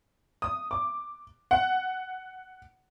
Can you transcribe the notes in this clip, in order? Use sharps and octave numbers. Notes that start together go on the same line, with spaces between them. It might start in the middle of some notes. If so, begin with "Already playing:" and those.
D#6
D6
F#5